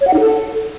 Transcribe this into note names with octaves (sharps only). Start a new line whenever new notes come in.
C#5
F#5
D#4
A4